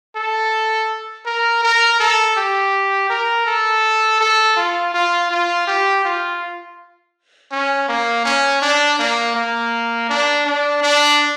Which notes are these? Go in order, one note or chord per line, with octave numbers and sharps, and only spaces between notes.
A4
A#4
A#4
A4
G4
A#4
A4
A4
F4
F4
F4
G4
F4
C#4
A#3
C#4
D4
A#3
A#3
D4
D4
D4